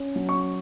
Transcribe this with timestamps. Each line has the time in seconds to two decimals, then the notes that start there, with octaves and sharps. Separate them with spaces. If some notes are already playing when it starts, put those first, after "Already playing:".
Already playing: C#4
0.16 F#3
0.29 C#6